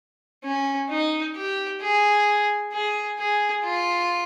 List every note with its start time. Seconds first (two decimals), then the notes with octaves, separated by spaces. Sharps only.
0.44 C#4
0.90 D#4
1.36 G4
1.81 G#4
2.73 G#4
3.19 G#4
3.64 F4